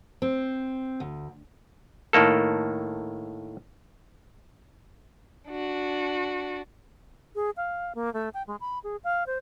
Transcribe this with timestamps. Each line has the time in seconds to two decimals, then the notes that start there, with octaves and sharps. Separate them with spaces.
0.22 C4
1.00 D2
2.13 A2 D#3 A#3 A4
5.48 D4 F#4
7.35 G#4
7.57 F5
7.95 A#3
8.14 A3
8.34 G5
8.47 G#3
8.60 B5
8.84 G#4
9.04 F5
9.27 C5